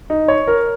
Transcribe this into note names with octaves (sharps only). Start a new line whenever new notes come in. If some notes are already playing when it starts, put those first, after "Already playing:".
D#4
C#5
A#4